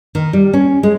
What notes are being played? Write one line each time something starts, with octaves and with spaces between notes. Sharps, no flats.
D#3
G3
C#4
G#3